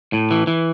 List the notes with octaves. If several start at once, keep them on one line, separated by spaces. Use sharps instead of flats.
A2
E3
E3